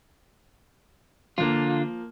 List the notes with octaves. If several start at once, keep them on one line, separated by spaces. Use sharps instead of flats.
D3 F3 A#3 F4